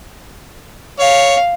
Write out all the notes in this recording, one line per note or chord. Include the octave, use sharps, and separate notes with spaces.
C#5 F5